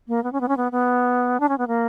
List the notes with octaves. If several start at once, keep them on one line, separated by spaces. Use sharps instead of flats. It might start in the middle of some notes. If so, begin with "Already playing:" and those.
A#3
B3
C#4
B3
C#4
B3
B3
D4
C#4
B3
A#3